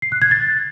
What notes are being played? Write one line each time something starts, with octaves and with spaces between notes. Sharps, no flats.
C7
F#6
G#6
A6